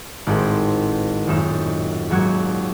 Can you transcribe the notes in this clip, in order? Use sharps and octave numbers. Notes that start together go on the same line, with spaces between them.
G#1 A2 C4 G#4
D#1 F#2 D#4 E7
D#2 G#2 F#3 F#4 G#6